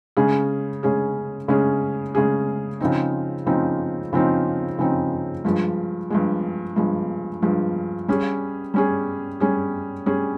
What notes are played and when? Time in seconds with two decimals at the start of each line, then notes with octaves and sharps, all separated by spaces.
0.17 C#3 G#3 C#4 G#4
0.83 C#3 G#3 C#4 G#4
1.48 C#3 G#3 C#4 G#4
2.15 C#3 G#3 C#4 G#4
2.80 C#3 F3 C4 D#4
3.46 C#3 F3 C4 D#4
4.13 C#3 F3 C4 D#4
4.79 C#3 F3 C4 D#4
5.44 G2 F3 G#3
6.10 G2 F3 G#3
6.76 G2 F3 G#3
7.42 G2 F3 G#3
8.08 G3 C#4 G#4
8.74 G3 C#4 G#4
9.40 G3 C#4 G#4
10.06 G3 C#4 G#4